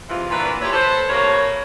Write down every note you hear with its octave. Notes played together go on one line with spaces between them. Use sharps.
C3 E3 G#3 F4
A#2 E3 D4 F#4 B4
A#2 E4 G4 C#5
A4 B4 C5
A2 C3 A#3 C#5